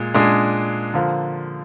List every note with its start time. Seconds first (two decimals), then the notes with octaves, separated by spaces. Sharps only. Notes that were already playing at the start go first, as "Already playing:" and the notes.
Already playing: A#2 G#3
0.14 A#2 G#3 D4 G#4
0.94 D3 F3 A#3 F4